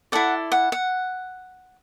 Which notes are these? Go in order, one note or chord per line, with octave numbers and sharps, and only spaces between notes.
E4 A4 D5 F#5
F#5
F#5